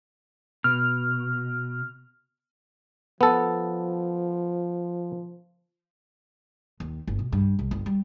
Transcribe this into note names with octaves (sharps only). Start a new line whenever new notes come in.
B2 F6
F3 B3 A4
D#2
G1
B2
G2
C2
G1
G3